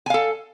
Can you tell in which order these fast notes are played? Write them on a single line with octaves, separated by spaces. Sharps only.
G#5 F5 A4